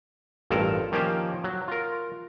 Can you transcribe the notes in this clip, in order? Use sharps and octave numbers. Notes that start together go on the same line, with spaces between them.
A1 G2 F4 A4 A#4 A5
D#3 F3 A#3 C#4 G4 C5
F#3
F4 A#4